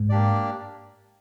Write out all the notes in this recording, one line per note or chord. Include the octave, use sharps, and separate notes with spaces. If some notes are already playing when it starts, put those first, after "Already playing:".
Already playing: G#2
A#3 D4 G4 D5